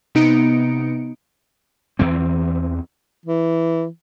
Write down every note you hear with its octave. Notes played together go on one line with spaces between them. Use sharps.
C3 B3 D#4 C#7 D7
E2 E3 C4
E3